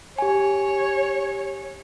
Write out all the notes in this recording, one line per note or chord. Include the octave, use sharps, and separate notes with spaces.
G4 C#5 G#5